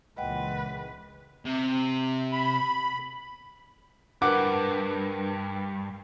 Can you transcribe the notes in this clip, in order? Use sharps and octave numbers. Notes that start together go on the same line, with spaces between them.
C#2 A#2 E3 B4 D#5 F#5 G5
C3
B5
G2 D4 A#4 B4 F#5 D6